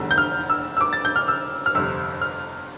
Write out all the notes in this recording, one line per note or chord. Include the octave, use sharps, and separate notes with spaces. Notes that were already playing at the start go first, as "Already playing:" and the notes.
Already playing: F1 E2 D3 G3
G6
F6
E6
E6
D6
A6
G6
F6
E6
F6
G1 F2 C3 E6
F6